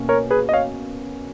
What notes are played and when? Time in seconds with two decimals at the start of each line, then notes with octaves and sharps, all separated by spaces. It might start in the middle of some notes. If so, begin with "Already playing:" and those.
Already playing: B2 A#3 C#4
0.09 A#4 C#5
0.30 G#4 B4
0.49 D#5
0.53 C#5 F5